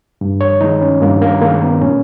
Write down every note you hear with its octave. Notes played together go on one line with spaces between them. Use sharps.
G2
C#5
D#3 G#3 D#4
C#4
G2 A#3
A#3
D#3 G#3 A#3
B3
A#2 C#4